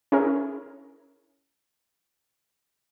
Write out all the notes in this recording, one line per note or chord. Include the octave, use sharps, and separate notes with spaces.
C#4 E4 G#4 A#4